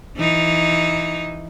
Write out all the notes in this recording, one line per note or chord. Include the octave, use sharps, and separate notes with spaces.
E3 D#4